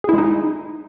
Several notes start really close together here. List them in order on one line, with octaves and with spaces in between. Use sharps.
G#4 E4 G#3 D#4